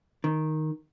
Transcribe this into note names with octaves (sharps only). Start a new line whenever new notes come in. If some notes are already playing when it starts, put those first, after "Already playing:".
D#3